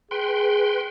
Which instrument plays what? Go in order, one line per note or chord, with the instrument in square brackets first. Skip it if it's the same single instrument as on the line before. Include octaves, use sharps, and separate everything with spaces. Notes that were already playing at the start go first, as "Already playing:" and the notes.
[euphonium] G#4 [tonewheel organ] B4 G5 C6